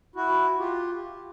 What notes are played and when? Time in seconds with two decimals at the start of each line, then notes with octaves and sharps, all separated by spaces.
0.16 E4 F#4
0.59 F4 G4